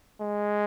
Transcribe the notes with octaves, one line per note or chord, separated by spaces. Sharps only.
G#3